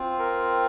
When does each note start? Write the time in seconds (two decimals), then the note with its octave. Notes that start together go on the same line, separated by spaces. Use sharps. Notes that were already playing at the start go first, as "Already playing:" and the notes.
Already playing: C4 F4
0.19 A#4